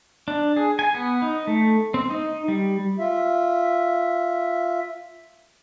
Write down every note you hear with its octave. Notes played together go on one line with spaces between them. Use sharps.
D4
G#4
G#5
B3
D#4
A3
C4
D#4
G3
F4 E5